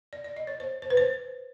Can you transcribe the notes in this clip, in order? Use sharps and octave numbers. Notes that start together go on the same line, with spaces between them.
D5
D5
D#5
C#5
C5
C5
B4
C5